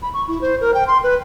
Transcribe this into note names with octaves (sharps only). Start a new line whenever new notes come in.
B5
C#6
E4
C5
A#4
G5
C6
B4